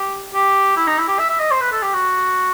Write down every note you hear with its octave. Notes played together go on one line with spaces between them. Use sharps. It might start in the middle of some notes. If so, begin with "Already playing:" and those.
Already playing: G4
G4
E4
D#4
E4
G4
E5
E5
D#5
C5
B4
A4
G4
F#4